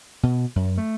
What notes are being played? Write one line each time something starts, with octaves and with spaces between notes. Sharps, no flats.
B2
F#2
A3